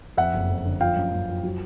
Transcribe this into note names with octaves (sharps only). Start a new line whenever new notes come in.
F2 E5 F#5
F#1
F2
D3
F3 F5 G5
F#2
F#2
F3
F#3